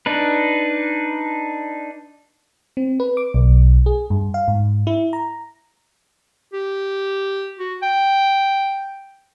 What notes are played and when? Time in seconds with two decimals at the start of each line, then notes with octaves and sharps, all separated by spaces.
0.06 D4 D#4 B4
2.77 C4
3.00 B4
3.17 D6
3.34 B1
3.86 G#4
4.10 G2
4.34 F5
4.48 G#2
4.87 E4
5.13 A#5
6.53 G4
7.59 F#4
7.83 G5